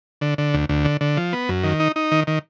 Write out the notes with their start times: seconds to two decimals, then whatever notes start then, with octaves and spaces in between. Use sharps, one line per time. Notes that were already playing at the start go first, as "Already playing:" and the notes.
0.21 D3
0.38 D3
0.54 D2
0.69 D2
0.85 D3
1.01 D3
1.17 F3
1.33 B3
1.49 F#2
1.64 D#3
1.80 D#4
1.96 D#4
2.12 D#3
2.27 D#3